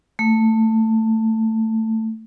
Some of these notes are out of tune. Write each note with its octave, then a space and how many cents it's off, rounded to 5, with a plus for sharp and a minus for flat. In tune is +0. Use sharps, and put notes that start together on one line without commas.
A3 +15